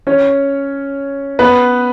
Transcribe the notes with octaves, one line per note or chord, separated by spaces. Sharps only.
C#4 C#5
B3 B4